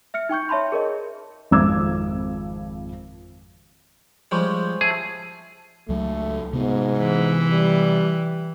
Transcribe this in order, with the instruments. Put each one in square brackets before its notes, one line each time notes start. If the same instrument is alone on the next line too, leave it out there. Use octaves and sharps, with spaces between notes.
[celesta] E5 F6 C#7
D#4 G5 C#6 G6
C#5 E5 A5 B5 C6
G#4 A#4 C#5 D#5
[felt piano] G#1 F2 F3 D6 E6 G#6
[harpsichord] F3 G3 G#3 [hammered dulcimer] C5 C#5
[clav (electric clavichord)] G#4 [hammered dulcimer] E5 A5
[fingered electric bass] C#2 F#3 [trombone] A3
[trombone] G#2 [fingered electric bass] C3 B3
[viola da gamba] E3
[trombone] G3